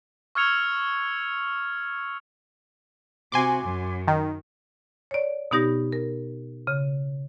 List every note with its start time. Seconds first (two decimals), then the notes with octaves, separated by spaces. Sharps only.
0.35 C#6 E6 F6 G#6 C#7 F7
3.32 C3 F#4 G#5 C6 D6
3.63 F#2
4.08 D#3
5.11 C#5 D5
5.51 B2 B3 D#4 G4 A#6
5.92 A#4
6.67 C#3